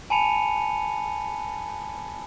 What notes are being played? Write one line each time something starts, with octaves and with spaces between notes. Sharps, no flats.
G#5 A5 B5 C#7 D#7 F7